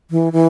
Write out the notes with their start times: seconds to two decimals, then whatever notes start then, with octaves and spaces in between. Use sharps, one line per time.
0.11 E3
0.33 E3